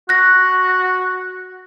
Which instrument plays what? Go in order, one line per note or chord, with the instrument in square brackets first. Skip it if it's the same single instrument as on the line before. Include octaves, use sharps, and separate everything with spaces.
[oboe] F#4 [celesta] F#6 A#6